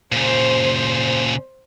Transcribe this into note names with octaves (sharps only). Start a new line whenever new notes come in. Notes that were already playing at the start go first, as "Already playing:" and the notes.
A#2 C#3 C5